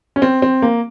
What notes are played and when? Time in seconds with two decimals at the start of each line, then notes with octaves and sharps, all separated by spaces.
0.16 C#4
0.22 C4
0.42 C4
0.62 A#3